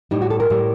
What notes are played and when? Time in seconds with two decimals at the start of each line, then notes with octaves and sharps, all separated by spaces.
0.11 A2 G3 D#4
0.22 F#4
0.30 A4
0.40 A#4
0.50 A2 G3